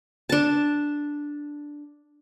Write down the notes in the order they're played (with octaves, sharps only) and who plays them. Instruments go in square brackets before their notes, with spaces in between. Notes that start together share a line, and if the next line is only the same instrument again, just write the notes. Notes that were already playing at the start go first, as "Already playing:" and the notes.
[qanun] D4 A5